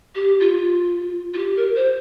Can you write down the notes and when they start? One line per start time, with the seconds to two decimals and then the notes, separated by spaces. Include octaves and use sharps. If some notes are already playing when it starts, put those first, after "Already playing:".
0.15 G4
0.40 F4
1.34 F4
1.38 G4
1.57 A#4
1.76 C5